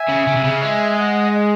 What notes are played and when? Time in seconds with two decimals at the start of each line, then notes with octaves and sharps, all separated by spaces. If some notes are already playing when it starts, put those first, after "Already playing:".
Already playing: E5 G#5
0.09 C#3
0.27 C#3
0.36 C3
0.44 C#3
0.61 G#3 E5 G#5
0.96 D#5 F#5